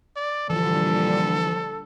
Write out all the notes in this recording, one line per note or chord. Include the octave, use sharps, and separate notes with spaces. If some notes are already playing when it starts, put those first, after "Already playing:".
D5
A#2 D3 E3 F3 G3 A4